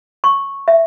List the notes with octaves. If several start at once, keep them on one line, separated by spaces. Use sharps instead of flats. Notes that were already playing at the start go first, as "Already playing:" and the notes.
C#6
E5